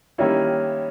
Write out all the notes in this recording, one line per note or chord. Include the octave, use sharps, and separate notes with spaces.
D#3 G3 A#3 C#4 E4